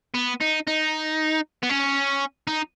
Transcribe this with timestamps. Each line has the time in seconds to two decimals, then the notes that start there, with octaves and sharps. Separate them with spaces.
0.14 B3
0.41 D#4
0.67 D#4
1.63 B3
1.69 C#4
2.47 D#4